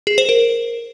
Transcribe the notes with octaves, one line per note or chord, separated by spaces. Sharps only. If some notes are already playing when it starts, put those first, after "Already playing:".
G#4
C5
A#4